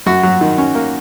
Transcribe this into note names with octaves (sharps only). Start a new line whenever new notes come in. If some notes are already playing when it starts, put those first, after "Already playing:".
F#2 F#4
F#3
D#3
C#4
A#3